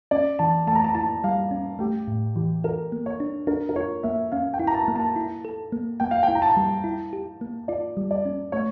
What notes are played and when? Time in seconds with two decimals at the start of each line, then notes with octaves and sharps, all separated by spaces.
0.11 C#4 D5
0.39 E3 A5
0.67 A3 A5
0.75 A#5
0.84 A5
0.95 E4 A5
1.24 G3 F5
1.51 C#4
1.79 A3 G4
2.08 A2
2.36 E3 G4
2.64 A4 A#4
2.92 A#3
3.06 C#5
3.20 D4
3.47 D4 A#4
3.69 A#4
3.76 F4 C#5
4.03 A#3 E5
4.32 C#4 F5
4.54 G5
4.59 E4
4.67 A#5
4.74 A5
4.88 A#3
4.96 A5
5.16 E4
5.45 A4
5.72 A#3
6.00 A#3 G5
6.11 F5
6.23 G5
6.28 E4
6.35 A#5
6.42 A5
6.57 G3
6.84 E4
7.13 G4
7.41 A#3
7.68 F4 D5
7.97 G3
8.11 D5
8.25 C#4
8.52 A3 C#5